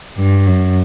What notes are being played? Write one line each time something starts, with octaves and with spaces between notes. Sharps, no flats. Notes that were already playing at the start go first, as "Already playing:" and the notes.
G2
F#2